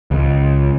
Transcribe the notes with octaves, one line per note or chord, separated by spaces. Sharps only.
C#2